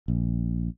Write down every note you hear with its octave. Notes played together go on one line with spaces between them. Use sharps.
A#1